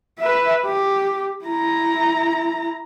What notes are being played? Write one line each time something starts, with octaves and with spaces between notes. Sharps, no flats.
B4 E5
G4
E4 A#5